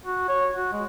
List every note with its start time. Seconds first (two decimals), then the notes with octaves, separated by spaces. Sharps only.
0.05 F#4
0.28 C#5
0.55 F#4
0.73 G#3